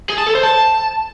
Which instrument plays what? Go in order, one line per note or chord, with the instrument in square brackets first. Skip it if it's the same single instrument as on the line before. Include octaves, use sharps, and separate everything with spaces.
[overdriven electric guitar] G#4
A5
A4
C5
A5